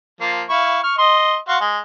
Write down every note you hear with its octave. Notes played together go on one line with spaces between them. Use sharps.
F3 A#3
E4 F5 C#6
C#6 F6
D#5 C6
F#4 F5 C6
G#3